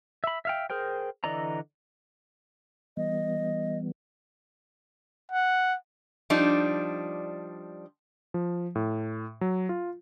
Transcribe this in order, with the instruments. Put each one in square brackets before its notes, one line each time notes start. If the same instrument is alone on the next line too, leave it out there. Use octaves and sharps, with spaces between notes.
[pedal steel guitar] E5 B5
E5 F5 G5
G#4 A#4 C5 G5
D3 E3 D5 D#5 A#5
[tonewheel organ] E3 G3 B3 [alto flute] D#5
[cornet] F#5
[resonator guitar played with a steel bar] F3 G3 D4 D#4
[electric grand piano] F3
A2
F#3
F4